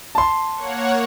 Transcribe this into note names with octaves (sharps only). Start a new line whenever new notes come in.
A5 C6
A#3 C#5 F#5